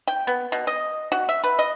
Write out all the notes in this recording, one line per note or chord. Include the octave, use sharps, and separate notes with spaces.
G5
B3
B2
D#5
F#4
E5
B4
D#5